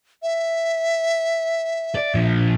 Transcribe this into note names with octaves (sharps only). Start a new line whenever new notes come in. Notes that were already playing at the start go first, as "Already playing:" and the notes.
E5
D5
A#2 F3